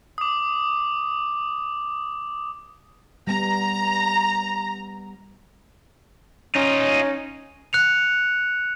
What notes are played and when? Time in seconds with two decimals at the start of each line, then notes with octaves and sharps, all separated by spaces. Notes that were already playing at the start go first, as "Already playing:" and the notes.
0.18 D6 D#6
3.27 G3 B3 A#5
6.56 C#4 D#4 F4
7.73 F#6 C#7 F7